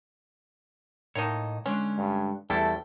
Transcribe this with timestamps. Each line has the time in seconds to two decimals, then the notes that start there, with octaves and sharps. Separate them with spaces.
1.15 A2 D#3 A#3 D#4 C#5 D#5 A5
1.66 D3 G#3 C#4 D4
1.98 G2
2.50 E2 G3 A3 E4 A4 G5